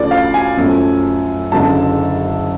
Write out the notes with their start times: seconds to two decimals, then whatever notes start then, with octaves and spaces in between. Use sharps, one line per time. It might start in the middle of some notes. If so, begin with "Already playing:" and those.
Already playing: D2 C#3 F3 A3 D5
0.11 F5
0.34 G#5
0.57 F#2 F3 A3
1.52 F#1 F#2 D3 G#3 A5